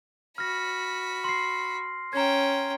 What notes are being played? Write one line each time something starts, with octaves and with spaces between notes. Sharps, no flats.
F#4 B5 F6 A#6
C6 C7
C#4 G5 A#5 G#6